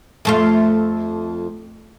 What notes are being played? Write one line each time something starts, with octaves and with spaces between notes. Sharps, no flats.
F2 A3 F4